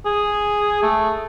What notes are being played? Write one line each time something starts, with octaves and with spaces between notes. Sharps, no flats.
G#4
A3